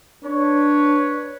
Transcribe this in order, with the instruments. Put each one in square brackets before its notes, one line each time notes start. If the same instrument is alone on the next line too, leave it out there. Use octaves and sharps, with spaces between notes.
[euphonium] D4 [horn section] B4 C#5